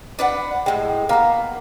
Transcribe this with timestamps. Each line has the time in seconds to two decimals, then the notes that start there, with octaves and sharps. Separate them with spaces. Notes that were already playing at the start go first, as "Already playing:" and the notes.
0.19 D4 B4 F#5
0.66 A2 G#3 G5
1.09 A#3 B3 F5 A#5